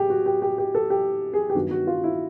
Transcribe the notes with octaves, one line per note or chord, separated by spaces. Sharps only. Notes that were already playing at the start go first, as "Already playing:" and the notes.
Already playing: A2 G4 G#4
F#4
G4
G4
G4
A4
G4
G#4
G4
G2 D#3 F#3 B3 F#4
F#4
F4
E4